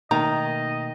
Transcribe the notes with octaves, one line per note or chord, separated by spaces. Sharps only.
B2 D#3 A3 A#3 D#5 A#5